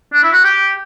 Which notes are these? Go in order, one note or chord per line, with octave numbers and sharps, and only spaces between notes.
D4
E4
F#4
G4